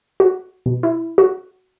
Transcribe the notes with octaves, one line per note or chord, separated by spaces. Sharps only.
F#4
B2
E4
F#4